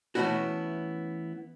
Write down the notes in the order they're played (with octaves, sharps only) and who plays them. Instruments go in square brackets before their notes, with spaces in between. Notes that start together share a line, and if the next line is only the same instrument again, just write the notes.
[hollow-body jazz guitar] E3 A3 B3 C#4 E4 F#4